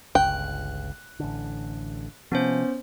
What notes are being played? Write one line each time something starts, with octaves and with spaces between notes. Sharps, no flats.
G1 C#2 G5 F#6
A1 D3
C3 F3 B3 C#4 C5